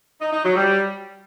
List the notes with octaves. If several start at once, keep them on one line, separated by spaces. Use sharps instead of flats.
D#4
D#4
F#3
G3